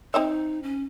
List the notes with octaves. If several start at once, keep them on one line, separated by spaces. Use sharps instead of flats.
C4 D#4 D#5 E5
C#4